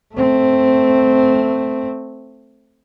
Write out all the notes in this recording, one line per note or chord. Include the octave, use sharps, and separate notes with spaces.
A3 C4